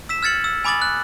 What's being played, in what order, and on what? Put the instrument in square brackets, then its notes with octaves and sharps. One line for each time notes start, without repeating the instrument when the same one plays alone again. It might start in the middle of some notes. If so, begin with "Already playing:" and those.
[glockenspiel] E6 B6 E7
F6 G#6 A6 C#7 F#7
E6
G#5 B5 D6 D#6 A6 F#7
F#6